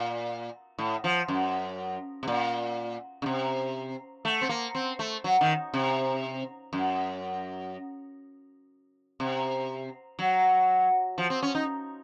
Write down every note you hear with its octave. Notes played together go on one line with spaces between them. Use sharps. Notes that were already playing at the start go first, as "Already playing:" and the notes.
Already playing: A#2
A2
F3
F#2
C3
A#2
C#3
C3
A3
C4
A#3
C4
A3
F#3
D#3
C3
F#2
C3
F#3
F3
C4
C#4
D#4